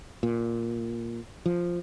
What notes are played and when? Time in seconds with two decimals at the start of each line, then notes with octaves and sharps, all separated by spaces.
0.23 A#2
1.46 F3